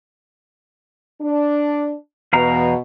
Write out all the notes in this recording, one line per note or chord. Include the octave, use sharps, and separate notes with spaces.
D4
E2 B2 F5 A#5